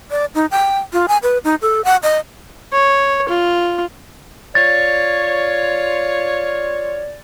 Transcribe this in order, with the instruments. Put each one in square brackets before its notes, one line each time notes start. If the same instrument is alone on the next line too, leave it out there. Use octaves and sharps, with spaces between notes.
[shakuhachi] D5
D#4
G5
F4
G#5
B4
D#4
A4
F#5
D#5
[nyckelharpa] C#5
F4
[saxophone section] F4 C#5 [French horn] D5 [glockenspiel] A6